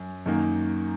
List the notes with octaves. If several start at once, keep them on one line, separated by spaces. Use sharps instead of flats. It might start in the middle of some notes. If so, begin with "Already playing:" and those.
Already playing: F#2
F#2 D#3 A#3